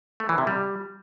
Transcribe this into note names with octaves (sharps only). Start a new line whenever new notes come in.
A3
E3
C3
G3